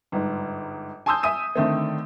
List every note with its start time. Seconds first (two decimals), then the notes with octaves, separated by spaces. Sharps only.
0.12 G1 G#2
1.06 G#5 A5 C6 D#6 E6 G6
1.23 E5 G#5 D#6 D#7
1.55 D3 D#3 A3 C4